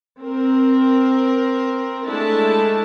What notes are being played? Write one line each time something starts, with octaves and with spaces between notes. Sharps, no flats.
C4 A#4
G#3 A3 D4 E4 A5